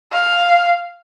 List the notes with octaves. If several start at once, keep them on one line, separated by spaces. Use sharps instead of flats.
F5